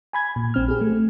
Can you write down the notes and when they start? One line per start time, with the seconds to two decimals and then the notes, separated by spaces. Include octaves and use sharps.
0.13 G#5 B5 G#6
0.36 A#2
0.54 A#1 C4 F6
0.68 G4 G#4
0.81 A3